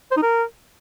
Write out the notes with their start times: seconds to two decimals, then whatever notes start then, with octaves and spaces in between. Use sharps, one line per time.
0.11 C5
0.17 D#4
0.22 A#4